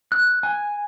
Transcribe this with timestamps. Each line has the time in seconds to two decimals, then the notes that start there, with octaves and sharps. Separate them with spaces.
0.12 F#6
0.43 G#5